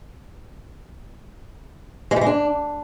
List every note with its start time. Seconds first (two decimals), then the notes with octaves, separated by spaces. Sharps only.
2.11 G#3
2.16 G3
2.21 G#3
2.27 D4